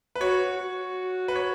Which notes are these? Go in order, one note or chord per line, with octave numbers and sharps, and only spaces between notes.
B4
F#4 C#5
F#4
B4
C#5